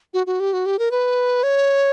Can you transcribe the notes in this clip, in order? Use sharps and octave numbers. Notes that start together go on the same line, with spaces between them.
F#4
F#4
G4
F#4
G4
A#4
B4
C#5